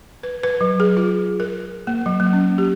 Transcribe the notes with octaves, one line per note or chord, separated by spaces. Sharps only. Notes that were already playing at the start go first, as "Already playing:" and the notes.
B4
B4
F#3
G#4
F4
A#4
A#3
F#3
A#3
C#4
G4